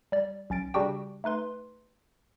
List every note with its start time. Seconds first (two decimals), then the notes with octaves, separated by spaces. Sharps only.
0.12 G3 D5
0.50 B1 C#4 A6 D7
0.74 C#3 G3 D4 F#4 G4 G5
1.24 A3 D#4 B4 C6